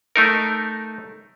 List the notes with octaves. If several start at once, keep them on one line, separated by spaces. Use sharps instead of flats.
A3 D#4 A#4